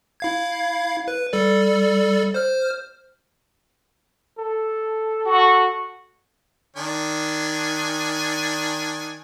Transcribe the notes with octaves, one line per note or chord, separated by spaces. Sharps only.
E4 F5 G#6
B4
G3 A4 D5
C5 F6
A4
F#4
D#3 D4 G#5